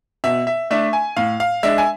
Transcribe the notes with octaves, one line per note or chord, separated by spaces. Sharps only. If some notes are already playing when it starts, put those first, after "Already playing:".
B2 E5
E5
A3 D4 E5
G#5
A2 F5
F5
G#3 D4 E5
G#5